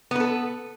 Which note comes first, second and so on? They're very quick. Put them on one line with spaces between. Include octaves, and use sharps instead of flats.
B3 B4 A4